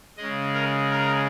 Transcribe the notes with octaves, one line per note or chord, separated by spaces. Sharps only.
C#3 G#3 D#5
A#4
A#4